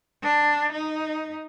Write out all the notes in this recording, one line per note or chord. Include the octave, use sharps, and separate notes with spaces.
D4
D#4